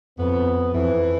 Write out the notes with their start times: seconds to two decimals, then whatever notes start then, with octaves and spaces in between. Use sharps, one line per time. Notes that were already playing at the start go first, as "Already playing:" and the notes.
0.18 F2 B3
0.74 F2 E3